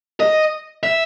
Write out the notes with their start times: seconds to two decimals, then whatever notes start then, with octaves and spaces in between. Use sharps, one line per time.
0.20 D#5
0.83 E5